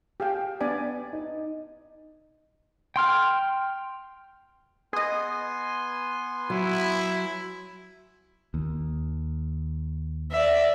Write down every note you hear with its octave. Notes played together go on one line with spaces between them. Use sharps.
G4 G#4 F5 G5
B3 D4 D5 G#5
D#4
G5 C6 F6
B3 G#4 D#5 G#5 C6
F#3 E4
D#2
D5 E5